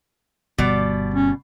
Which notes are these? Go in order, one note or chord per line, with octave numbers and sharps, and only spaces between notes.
G1 B2 G3 D5
C#4